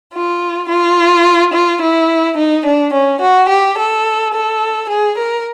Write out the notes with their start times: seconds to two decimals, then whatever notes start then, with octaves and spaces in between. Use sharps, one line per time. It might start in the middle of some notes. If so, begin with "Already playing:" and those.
0.12 F4
0.68 F4
1.52 F4
1.80 E4
2.36 D#4
2.64 D4
2.92 C#4
3.20 F#4
3.49 G4
3.76 A4
4.32 A4
4.89 G#4
5.17 A#4